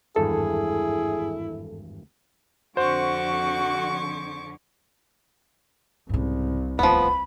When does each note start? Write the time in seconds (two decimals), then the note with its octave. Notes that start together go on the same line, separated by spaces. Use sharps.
0.16 G#1 E2 G2 E4 G#4 A4
2.77 F2 D3 F#4 C5 C#6 D6
6.09 C2 G#2 C#3
6.79 D1 F3 B3 B5